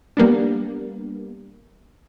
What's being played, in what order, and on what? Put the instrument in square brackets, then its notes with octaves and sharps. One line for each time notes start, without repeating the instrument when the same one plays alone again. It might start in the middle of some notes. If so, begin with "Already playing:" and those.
[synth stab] G3 A#3 B3 D4